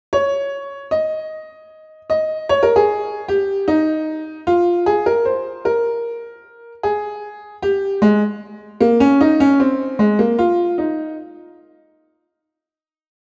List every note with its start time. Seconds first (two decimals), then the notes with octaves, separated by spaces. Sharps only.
0.13 C#5
0.91 D#5
2.10 D#5
2.49 C#5
2.63 A#4
2.76 G#4
3.28 G4
3.68 D#4
4.47 F4
4.86 G#4
5.06 A#4
5.25 C5
5.65 A#4
6.83 G#4
7.62 G4
8.02 G#3
8.81 A#3
9.00 C#4
9.21 D#4
9.40 C#4
9.60 C4
9.99 G#3
10.19 A#3
10.39 F4
10.78 D#4